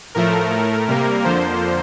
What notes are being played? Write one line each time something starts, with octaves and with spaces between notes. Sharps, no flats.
A2 F3 A3 A#4
A2 A3
C3 G3 A#3
F2 D3 F3 A#3 C5